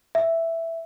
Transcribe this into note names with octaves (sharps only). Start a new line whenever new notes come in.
E5